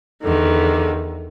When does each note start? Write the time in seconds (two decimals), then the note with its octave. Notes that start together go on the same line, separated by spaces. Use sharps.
0.23 E2 D3 D#3